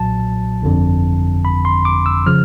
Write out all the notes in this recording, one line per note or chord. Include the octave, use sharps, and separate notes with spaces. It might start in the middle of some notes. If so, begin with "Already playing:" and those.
Already playing: B1 A#2 F#3 A5
G1 F2 D3
B5
C6
D6
E6
C#3 F3 F6